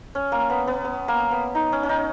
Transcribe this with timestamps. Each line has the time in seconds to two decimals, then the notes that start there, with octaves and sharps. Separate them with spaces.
0.15 C#4
0.32 A#3
0.50 B3
0.67 B3
0.85 B3
1.08 A#3
1.31 B3
1.55 D#4
1.72 C#4
1.83 C#4
1.89 D#4